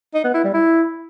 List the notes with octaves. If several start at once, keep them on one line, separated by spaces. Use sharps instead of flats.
D#4
B3
E4
G3
E4